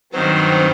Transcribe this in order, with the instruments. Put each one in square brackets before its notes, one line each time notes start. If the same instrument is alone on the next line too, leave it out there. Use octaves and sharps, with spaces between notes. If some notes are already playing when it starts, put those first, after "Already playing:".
[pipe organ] G2 D#3 F#3 [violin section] C4 C5